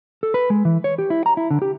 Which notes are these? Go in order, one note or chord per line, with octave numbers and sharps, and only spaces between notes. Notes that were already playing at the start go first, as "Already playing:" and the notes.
A4
B4
G#3
E3
C#5
G4
E4
A#5
E4
D3
G4